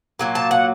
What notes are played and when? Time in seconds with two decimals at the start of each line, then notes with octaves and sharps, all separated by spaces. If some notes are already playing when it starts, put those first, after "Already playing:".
0.19 A#2 F#3 A#3
0.35 A5
0.51 F#5